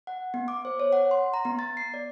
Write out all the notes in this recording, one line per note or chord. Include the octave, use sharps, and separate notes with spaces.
F#5
B3
D6
C5
C#5
F#5
C6
A#5
B3
A6
C7
D5